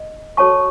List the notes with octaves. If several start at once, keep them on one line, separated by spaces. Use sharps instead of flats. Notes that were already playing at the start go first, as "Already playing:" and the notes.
Already playing: D#5
F#4 A4 C#5 A5 C#6